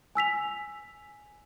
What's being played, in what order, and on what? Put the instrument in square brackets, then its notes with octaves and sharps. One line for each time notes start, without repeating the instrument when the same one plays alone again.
[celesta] G#5 E6 B6 F7